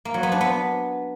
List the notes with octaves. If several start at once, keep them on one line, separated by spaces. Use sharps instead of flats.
A#3
F#3
B3
D4
B3